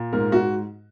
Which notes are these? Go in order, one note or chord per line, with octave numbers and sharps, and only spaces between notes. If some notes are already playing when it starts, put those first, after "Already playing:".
Already playing: A#2
G#2 A#4
F#4